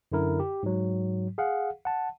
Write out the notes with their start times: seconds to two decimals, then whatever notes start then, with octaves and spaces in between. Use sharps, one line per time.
0.12 F#2 D3 E4 A#4
0.40 G4
0.63 G#2 F#3
1.38 G#4 F5 F#5
1.85 F#5 A5